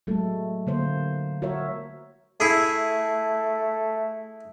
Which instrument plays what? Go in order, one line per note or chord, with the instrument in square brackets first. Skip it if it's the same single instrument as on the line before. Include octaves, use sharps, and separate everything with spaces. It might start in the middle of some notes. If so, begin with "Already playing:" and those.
[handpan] F#3 G#3 A3 A4
D3 A#3 C5
F#4 A#4 C#5 E5
[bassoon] A3 [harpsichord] E4 G#4